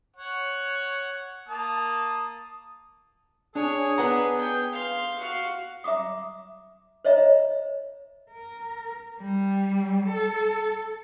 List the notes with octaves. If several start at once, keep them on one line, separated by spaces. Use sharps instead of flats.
C#5 F#5
A#3 A5 D#6
D4 G#4 C#5
B3 D4 B4 F#5 A#5
G5
F5 C6
F#4 F5
E5 A#5 D6 D#6
C5 C#5 D#5 E5 A#5
A#4
G3
A4